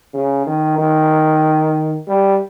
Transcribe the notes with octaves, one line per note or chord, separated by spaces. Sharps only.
C#3
D#3
D#3
G3